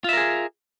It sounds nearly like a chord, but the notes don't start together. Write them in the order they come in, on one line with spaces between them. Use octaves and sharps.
F4 E5 A#4 G#4